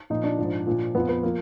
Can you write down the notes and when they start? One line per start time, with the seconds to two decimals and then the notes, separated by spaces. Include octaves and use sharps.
0.10 A#2 F3 D#4
0.24 D4
0.38 G#2 F3
0.67 A#2 F3
0.95 F2 F3 B3
1.09 B3
1.23 F3 A#3